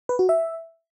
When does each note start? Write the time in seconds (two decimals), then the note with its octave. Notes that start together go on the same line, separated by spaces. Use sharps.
0.09 B4
0.19 F#4
0.29 E5